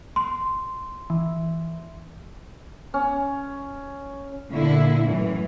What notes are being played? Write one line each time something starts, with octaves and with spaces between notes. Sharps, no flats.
C6
E3
C#4
A#2 D3 E4
F#2 A2 E3